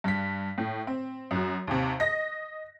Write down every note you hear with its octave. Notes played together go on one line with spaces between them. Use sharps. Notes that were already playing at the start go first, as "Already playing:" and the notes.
G2 B6
A2
C4
F#2 F#4
D#2 C3
D#5 A#6